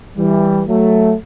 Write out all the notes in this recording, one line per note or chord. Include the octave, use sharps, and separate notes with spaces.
E3 G3
F#3 A3